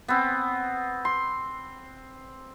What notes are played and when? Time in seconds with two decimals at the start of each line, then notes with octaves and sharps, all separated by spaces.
0.08 B3 C4
1.05 C6